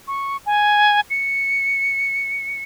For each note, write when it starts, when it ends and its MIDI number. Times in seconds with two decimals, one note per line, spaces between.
0.08 0.37 85
0.46 1.00 80
1.10 2.63 97